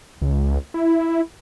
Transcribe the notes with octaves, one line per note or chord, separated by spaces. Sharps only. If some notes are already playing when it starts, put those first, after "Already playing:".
C#2
E4